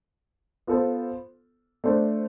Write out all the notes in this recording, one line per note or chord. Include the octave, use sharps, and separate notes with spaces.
B3 F4 A4 C5
A3 D4 A4 C5